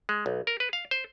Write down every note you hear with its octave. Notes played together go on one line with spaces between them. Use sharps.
G#3
B1
A#4
B4
F5
C5